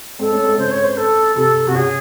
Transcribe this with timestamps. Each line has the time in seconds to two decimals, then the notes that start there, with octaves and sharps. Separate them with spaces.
0.19 G#3 C4 A4
0.31 A3 C#4
0.44 G#3 C4
0.58 C#3 C5
0.71 C#5
0.84 C5
0.97 A4
1.35 C3 A4
1.67 C3 F#4
1.75 C#3 G#4